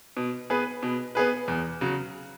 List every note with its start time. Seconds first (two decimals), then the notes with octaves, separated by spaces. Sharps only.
0.17 B2
0.50 B3 G#4 B4
0.83 B2
1.15 B3 G#4 B4
1.48 E2
1.81 C#3 F#3